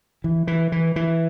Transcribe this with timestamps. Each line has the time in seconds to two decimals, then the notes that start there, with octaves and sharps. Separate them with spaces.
0.24 E3
0.47 E3
0.72 E3
0.96 E3